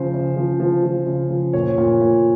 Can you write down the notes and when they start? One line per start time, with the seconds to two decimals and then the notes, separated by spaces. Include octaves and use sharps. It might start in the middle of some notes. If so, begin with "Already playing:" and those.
Already playing: C#3 F3 C5
0.14 C#3
0.37 F3
0.60 F3
0.84 F3
1.07 C#3
1.30 F3
1.53 A#2 C#5
1.78 A#2
2.01 A#2